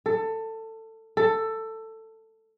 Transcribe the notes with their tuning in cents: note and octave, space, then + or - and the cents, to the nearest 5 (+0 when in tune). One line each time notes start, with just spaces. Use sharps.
A4 +20
A4 +15